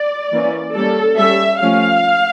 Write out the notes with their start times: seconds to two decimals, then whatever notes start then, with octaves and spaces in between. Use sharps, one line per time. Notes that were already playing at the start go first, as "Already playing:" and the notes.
Already playing: D5
0.32 E3 A#3 C#4
0.75 G3 A#3 C#4 A4
1.18 G3 C#4 E5
1.61 F3 A3 C#4 F5